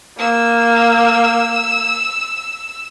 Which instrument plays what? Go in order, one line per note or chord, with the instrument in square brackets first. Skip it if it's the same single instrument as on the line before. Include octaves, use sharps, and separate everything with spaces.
[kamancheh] A#3 [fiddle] E6